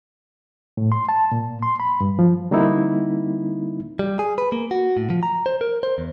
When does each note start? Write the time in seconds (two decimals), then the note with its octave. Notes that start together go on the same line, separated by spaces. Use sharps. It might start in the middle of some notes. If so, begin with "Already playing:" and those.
0.77 A2
0.92 C6
1.09 A5
1.32 A#2
1.62 C6
1.80 B5
2.01 G2
2.19 F3
2.51 D3 G3 A#3 C4 D#4 E4
3.99 G3
4.19 G#4
4.38 B4
4.52 A#3
4.71 F#4
4.97 A2
5.10 F3
5.23 A#5
5.46 C5
5.61 A#4
5.83 C5
5.98 E2